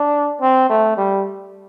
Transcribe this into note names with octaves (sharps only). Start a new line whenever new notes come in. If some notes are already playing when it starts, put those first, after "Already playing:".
Already playing: D4
C4
A3
G3